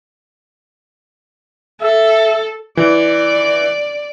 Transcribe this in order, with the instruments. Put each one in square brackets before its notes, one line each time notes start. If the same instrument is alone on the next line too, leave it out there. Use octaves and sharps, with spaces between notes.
[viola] A4 [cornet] E5
[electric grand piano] E3 [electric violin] D5